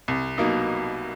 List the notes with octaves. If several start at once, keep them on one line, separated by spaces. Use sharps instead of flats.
C2
B2 F#3 A#3 D#4